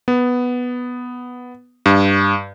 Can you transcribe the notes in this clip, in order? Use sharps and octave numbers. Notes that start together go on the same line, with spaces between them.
B3
G2